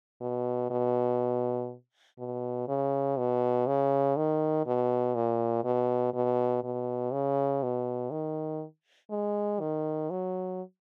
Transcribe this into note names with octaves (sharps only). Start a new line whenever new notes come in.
B2
B2
B2
C#3
B2
C#3
D#3
B2
A#2
B2
B2
B2
C#3
B2
D#3
G#3
D#3
F#3